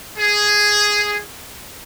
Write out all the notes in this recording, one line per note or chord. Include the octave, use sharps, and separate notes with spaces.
G#4